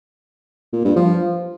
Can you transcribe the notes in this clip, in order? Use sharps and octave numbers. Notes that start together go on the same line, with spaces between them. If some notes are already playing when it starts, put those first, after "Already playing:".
A#2
G2
F3